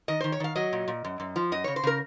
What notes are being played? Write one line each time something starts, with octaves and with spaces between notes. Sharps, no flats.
D#3 D#5
D#3 C5
C#5
D#3 F5
F#3 D#5
A#2
A#2
F#2
F#2
F3
F#2 D#5
C#3 C#5
C5
C#3 A#4